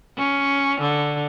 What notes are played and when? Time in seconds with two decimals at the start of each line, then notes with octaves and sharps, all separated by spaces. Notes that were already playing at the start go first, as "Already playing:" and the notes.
0.18 C#4
0.81 D3